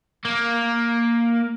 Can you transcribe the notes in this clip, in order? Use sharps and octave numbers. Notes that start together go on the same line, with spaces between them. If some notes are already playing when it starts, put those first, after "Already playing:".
A#3